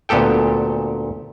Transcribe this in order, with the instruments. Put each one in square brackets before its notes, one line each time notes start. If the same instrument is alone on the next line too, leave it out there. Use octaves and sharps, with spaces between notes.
[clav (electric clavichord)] D2 A#2 B3 G4 A4 G5